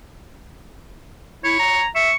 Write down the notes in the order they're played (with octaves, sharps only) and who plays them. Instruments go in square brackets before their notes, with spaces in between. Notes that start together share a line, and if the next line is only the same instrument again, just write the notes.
[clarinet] E4 [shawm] C#5
[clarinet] A#5
[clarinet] E5 [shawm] C#6